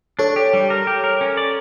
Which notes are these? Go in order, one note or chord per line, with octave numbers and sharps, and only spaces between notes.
D4 A4 C#5
G4
G3
A#4
G4
A#4
C#4
D5